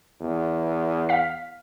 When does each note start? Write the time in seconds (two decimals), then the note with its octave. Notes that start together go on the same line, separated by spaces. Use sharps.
0.21 E2
1.09 F5 B6